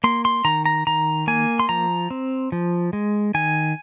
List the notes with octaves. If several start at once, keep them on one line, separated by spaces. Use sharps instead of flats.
A#3 C6
C6
D#3 A#5
A#5
D#3 A#5
A#3 G#5
C6
F3 A#5
C4
F3
G#3
D#3 G#5